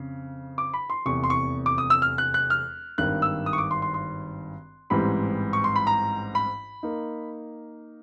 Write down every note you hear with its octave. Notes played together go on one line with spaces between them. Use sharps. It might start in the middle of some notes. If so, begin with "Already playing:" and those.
Already playing: F2 C#3
D6
B5
C6
F1 E2 C3 C#6
C6
C#6
D6
D#6
E6
F6
F#6
F#6
F6
G#1 G2 D#3 F#6
E6
D#6
C#6
D6
C6
C6
C6
A1 G#2 E3 G3 C4 B5
C#6
C6
B5
A#5
B5
A#3 D#4